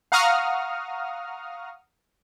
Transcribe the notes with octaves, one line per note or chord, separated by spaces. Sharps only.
F5 F#5 A#5 C#6 D#6 F6